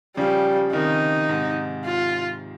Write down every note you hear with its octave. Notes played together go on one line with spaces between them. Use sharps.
C#3 F3 G3
C3 D#3 D#4
G#2 C3
F4